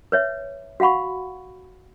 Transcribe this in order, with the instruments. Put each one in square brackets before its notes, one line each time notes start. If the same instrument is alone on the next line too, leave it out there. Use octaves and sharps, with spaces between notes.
[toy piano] B4 C#5 E5
F#4 F5 F#5 B5 C#6